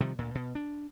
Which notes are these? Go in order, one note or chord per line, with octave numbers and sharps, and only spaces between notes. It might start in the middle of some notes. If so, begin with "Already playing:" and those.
C3 D#3 F3 G3
D2 A#2
B2
D4